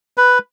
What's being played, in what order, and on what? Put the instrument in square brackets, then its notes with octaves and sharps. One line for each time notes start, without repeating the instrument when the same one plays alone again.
[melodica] B4